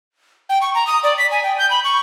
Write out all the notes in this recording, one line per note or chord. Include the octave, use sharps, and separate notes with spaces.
G5
C#6
A#5
D#6
D5
B6
G#5
G5
G6
B5
C#6